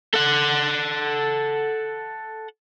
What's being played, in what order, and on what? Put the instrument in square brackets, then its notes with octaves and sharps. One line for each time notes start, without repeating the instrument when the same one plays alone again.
[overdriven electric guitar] A4 F#5